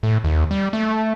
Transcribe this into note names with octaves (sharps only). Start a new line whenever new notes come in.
A2
D#2
G3
A3